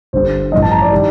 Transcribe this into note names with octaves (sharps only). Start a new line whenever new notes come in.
G1 G2 D3 G3 C5
A1 G2 F3 D#5
A5
A#5
D5
D#3 G3